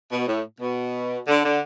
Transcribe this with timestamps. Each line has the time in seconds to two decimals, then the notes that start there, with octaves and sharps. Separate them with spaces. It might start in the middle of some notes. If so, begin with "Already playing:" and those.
0.09 B2
0.26 A2
0.59 B2
1.26 D3
1.43 D3